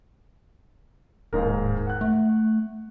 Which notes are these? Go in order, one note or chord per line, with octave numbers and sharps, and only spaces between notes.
D1 D#2 G#2 A#4
F#5 F#6
A3